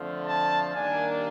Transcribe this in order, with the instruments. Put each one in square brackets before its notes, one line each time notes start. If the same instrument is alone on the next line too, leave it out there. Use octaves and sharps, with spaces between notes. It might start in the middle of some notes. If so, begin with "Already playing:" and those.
Already playing: [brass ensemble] F2 D3 F3 A3
[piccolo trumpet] A5
[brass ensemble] D#2 D#3 G3 A#3 D4 [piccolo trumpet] G#5